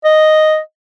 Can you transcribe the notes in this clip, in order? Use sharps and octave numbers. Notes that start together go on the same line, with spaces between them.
D#5